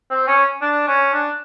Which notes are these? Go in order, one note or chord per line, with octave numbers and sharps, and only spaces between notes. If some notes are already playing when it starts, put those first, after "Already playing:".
C4
C#4
D4
C#4
D4